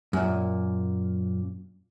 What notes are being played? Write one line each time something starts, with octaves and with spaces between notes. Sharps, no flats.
F#2 A#2